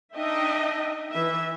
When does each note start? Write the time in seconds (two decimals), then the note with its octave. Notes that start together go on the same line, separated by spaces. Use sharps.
0.16 D4 D#4 D#5 E5 G5
1.12 E3 E5